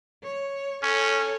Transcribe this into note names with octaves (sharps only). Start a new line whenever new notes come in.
C#5
C#4 A4 C#5